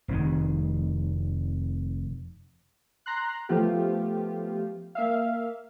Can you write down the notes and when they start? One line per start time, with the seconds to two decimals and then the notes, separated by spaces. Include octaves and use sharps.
0.08 F1 F2 D#3
3.06 A#5 C6 F#6
3.49 F3 A3 B3 F4 G4
4.95 A#3 E5 F5